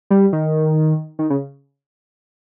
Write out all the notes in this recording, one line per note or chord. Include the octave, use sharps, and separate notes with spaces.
G3
D#3
D#3
C#3